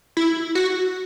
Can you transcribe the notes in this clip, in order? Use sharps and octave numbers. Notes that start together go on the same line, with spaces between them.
E4
F#4